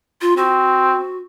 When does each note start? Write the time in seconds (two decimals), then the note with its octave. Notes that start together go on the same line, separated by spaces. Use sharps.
0.21 F4
0.37 C4 F#4